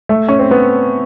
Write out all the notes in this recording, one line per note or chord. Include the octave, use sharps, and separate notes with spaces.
A3
C#4
C4
B3